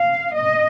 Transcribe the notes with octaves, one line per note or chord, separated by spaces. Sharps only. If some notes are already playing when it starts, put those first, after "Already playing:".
Already playing: F5
D#5